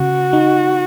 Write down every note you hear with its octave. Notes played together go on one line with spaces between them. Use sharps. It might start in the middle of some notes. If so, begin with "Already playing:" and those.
Already playing: C#3 F#4
D#4